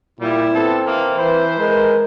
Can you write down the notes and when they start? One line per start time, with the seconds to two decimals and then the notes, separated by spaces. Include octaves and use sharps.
0.20 A#2 G3 E4
0.53 B3 C4 A4
0.84 D#3 E3 A#3
1.16 E3 B4 C5
1.59 G#3 A#4